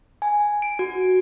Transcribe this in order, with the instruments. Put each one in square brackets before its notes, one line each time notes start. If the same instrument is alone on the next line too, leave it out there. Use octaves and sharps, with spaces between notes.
[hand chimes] G#5
D7
F#4